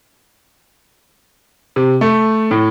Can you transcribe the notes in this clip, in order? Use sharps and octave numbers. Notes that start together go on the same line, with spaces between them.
C3
A3
A2